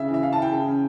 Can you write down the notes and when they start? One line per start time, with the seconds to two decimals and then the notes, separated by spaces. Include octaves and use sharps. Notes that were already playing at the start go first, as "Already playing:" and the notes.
Already playing: C#3 C#4 E5
0.08 E3
0.14 E5
0.23 E3 F5
0.33 A5
0.38 E3 G5
0.52 C#3
0.67 C#4